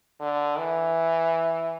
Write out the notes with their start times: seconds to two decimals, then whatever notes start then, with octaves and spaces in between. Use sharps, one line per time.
0.20 D3
0.58 E3